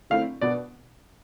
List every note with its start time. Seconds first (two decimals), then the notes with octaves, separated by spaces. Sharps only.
0.10 D3 A3 C4 E4 F5
0.41 B2 B3 D4 D5